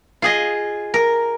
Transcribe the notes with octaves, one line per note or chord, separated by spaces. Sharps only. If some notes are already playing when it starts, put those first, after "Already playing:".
F4 G#4 D#5
A#4